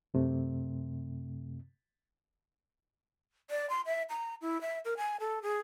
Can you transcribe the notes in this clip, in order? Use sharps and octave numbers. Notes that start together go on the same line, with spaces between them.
F#2 C3 A3
D5
C6
E5
A#5
E4
E5
A#4
G#5
A4
G#4